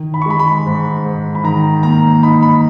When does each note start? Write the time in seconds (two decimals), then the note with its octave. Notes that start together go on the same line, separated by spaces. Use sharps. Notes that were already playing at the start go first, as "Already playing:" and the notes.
Already playing: D#3
0.14 B5
0.22 C#6
0.26 G#3 B5
0.39 B5
0.66 G#2
1.05 G#2
1.35 B5
1.44 D#3 A#5
1.83 A#3 A#5
2.23 D#4 B5
2.42 B5